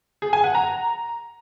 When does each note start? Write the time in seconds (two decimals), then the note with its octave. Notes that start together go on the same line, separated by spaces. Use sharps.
0.22 G#4
0.33 G#5
0.44 F#5
0.55 A#5